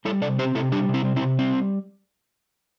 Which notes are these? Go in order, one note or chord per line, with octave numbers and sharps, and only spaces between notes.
G3 E4 A4
C3 A4 D5
C4 G4 C5
C3 E4 A4
G3 D4 G4
C3
C4 E4
C4
C4 E4
C3
G3 C4